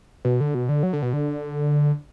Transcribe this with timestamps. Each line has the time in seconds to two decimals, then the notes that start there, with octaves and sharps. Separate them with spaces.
0.25 B2
0.40 D3
0.54 B2
0.69 D3
0.83 F#3
0.93 D3
1.02 B2
1.13 D3